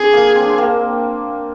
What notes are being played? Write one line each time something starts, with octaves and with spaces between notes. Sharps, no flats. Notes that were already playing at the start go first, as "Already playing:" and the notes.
Already playing: C4 D4 G#4
A#3
C4
D4
C4
A#3